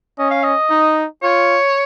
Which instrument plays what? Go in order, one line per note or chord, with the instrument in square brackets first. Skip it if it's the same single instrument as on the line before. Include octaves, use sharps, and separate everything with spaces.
[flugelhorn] C#4 [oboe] D#5
[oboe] F5
D#5
[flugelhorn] D#4
[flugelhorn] F4 [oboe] C#5